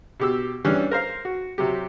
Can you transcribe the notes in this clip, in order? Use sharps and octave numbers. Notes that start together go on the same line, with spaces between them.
B2 G4 E6
E3 G3 C#4 D4
A#4 C5 F5
F#4
C3 F#3 G4